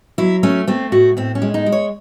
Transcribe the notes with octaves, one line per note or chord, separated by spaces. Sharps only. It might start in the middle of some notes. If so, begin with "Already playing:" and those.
F#3 E4
A3 C#4
A3 C4
A2 F#4
A2 C4
C#4
G#3
D#4
G#3
C#5